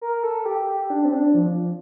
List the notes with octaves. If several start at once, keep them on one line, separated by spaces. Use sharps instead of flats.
A#4
A4
G4
G4
D4
C4
D4
F3